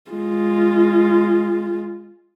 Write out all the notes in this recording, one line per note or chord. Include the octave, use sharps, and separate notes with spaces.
G#3 F4